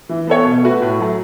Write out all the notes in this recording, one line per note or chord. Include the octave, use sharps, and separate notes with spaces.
E3
B3 A4 C#5
B2
A3 F#4 B4
A2
F#3 A3